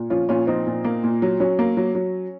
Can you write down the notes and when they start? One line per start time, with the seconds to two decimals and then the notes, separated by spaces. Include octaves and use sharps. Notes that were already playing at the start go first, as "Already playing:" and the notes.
Already playing: A#2
0.10 F3 C#4 F4
0.29 A#2 C#4 F4
0.47 F3 C4 D#4
0.67 A#2
0.85 A#3
1.04 A#2
1.22 F#3
1.40 F#3 C#4
1.59 A#3
1.77 F#3
1.95 F#3